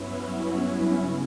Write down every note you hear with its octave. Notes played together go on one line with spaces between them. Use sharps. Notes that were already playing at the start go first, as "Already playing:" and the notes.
Already playing: G2 F#3 B3 C#4 E4
C#3